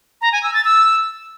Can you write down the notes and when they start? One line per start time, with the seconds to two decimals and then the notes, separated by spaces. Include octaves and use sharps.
0.21 A#5
0.32 G#5
0.43 E6
0.54 A6
0.65 E6